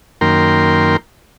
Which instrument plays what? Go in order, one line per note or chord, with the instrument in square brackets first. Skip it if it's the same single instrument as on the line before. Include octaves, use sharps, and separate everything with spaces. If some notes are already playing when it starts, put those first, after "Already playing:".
[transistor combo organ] F#2 D#3 A#3 A#4 G5 C6